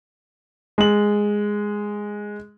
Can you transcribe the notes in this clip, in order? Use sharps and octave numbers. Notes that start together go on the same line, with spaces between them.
G#3 F#7